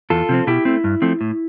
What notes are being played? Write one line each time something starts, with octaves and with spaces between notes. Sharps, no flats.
E2 F4 A4
C3 F3 C4
B2 E4 G4
A3 C4
G2
F3 A3 C4
A2